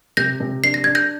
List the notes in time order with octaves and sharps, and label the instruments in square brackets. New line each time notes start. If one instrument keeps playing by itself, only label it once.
[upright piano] C3 [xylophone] G6 A#6
[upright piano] C3
[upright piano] D4 [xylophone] C7
[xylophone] A#6
[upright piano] D4 [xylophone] G#6
[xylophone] G6 A#6